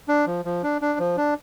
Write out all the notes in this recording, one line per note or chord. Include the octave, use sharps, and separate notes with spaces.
D4
F3
F3
D4
D4
F3
D4